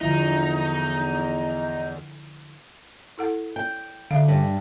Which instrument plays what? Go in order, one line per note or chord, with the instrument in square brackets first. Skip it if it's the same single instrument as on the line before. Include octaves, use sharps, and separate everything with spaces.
[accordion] E2 [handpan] D3 F3 E4 [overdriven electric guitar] D#4 [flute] A#5
[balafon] E4 A4 F#5
[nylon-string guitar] G5
[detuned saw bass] D3 [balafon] E5 F5
[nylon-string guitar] G2